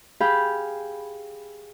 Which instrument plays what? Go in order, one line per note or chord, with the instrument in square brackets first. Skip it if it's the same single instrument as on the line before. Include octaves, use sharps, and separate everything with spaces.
[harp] G4 G#4 F5 G5 B5 G6